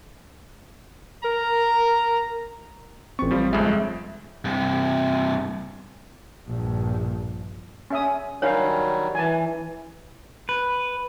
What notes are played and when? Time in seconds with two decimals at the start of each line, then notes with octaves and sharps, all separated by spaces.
1.24 A#4 A#5
3.19 A1 C4 C#6
3.31 F3 G3
3.53 G1 F2 G#3 E5
4.45 G2 C3
6.47 A#1 G2
7.90 C#4 E5 D#6
8.42 D#3 F#3 G3 D4 A#4 C#5 F5
9.15 E3 G#5 A5
10.49 B4